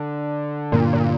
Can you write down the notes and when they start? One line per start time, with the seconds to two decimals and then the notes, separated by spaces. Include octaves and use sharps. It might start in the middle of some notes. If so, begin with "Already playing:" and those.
Already playing: D3
0.72 G2 A#2 D3 A#3 D4
0.93 A#2